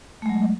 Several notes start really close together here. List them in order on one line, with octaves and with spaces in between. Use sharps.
A3 G#3 F#3